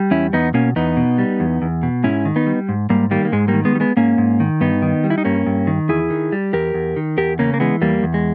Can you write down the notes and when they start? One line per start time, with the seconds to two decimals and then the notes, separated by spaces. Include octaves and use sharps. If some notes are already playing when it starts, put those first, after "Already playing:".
Already playing: G3
0.11 E2 C#4 E4
0.33 E2 B3 D#4
0.54 B2 A#3 C#4
0.76 E2 B3 D#4
0.97 B2
1.18 G3
1.40 E2
1.62 E2
1.83 B2
2.04 G#2 C#4 E4
2.25 D#3
2.36 B3 D#4
2.47 G3
2.69 G#2
2.90 G#2 G3 A#3
3.11 D#3 G3 A#3
3.25 A#3
3.32 G#2 G#3
3.48 G3 A#3
3.54 D#3
3.65 G#3 B3
3.75 G3
3.80 G#3 B3
3.96 G#2 A#3 C#4
4.18 G#2
4.40 D#3
4.61 G2 B3 D#4
4.82 D#3
5.04 G3
5.10 E4
5.18 D#4
5.25 G2 A#3 C#4
5.46 G2
5.67 D#3
5.89 E2 E4 G#4
6.10 D#3
6.32 G3
6.53 E2 G4 A#4
6.74 E2
6.96 D#3
7.18 E2 G4 A#4
7.39 C#3 A#3 C#4
7.54 A#3
7.60 E3 G#3 B3
7.81 E2 G3 A#3
8.03 E2
8.14 G#3